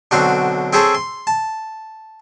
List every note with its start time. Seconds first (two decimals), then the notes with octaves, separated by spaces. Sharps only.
0.11 B1 D3 C4 F#4 F5
0.73 C4 E4 G#4 A4 C5 C#5
0.95 C6
1.27 A5